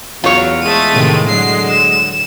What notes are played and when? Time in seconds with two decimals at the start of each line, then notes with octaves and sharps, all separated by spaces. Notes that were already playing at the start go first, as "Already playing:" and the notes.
0.24 E2 F#3 F4 C#5
0.61 G#3 A3 D#7
0.92 A2 C3 D#3
1.28 D3 F#3 C7
1.68 E7